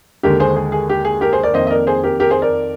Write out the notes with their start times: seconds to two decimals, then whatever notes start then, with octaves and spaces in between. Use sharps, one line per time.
0.23 D#2 D3 G#3 G4 A#4
0.40 G#4 C5
0.56 G#4
0.72 G#4
0.89 G4
1.05 G#4
1.21 G4 A#4
1.32 G#4 C5
1.43 A#4 D5
1.54 F2 D#3 A#3 C5 D#5
1.67 D#5
1.70 A#4 D5
1.87 G#4 C5
2.03 G4 A#4
2.20 G4 A#4
2.30 G#4 C5
2.42 A#4 D5